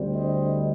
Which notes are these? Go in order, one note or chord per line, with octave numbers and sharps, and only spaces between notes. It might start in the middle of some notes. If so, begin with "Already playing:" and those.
Already playing: D2 D3 G3 C4
C5 D#5